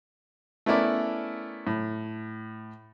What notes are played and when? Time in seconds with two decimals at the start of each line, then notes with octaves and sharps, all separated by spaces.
0.66 A3 B3 C#4 E4 A#4 D5
1.67 A2